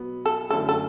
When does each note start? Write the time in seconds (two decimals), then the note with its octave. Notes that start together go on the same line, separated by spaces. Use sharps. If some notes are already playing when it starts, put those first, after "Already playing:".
Already playing: B2 F#3 B3
0.26 A4
0.50 F#2 D3 A3 C#4 E4 A4
0.69 A4